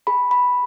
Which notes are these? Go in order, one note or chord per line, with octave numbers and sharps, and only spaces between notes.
G#4 B5
B5